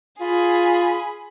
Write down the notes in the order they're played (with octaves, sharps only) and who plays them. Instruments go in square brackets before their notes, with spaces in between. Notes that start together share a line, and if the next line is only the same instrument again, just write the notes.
[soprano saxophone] F4 [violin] G#4 B5